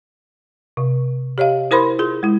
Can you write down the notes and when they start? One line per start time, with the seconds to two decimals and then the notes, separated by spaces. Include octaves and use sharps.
0.77 C3
1.38 G4 C#5 D#5 F5
1.71 E4 A#4 C5 B5 C6
1.99 F4 G#4 C6
2.23 G#3 E4